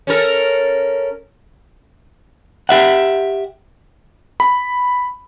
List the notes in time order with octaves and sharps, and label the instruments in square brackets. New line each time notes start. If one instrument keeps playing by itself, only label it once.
[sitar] C#4 A4 A#4
[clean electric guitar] G4 E5 F#5
[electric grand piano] B5